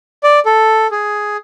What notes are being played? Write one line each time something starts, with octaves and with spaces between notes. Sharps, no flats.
D5
A4
G#4